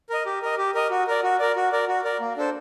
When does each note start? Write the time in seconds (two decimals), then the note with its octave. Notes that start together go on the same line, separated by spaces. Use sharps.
0.10 A#4 D#5
0.26 G4
0.42 A#4 D#5
0.58 G4
0.75 A#4 D#5
0.91 F#4
1.07 A#4 D5
1.23 F#4
1.39 A#4 D5
1.56 F#4
1.72 A#4 D5
1.88 F#4
2.04 A#4 D5
2.20 A#3
2.37 D4 A4 C5